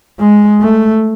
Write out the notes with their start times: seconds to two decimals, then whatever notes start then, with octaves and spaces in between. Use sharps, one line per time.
0.20 G#3
0.61 A3